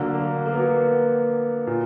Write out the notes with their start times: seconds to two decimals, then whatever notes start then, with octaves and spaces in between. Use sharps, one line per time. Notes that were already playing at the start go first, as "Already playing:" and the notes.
Already playing: D3 F#3 A#3
0.14 A#3
0.46 A#3
0.52 B3
0.60 A#3
1.67 A#2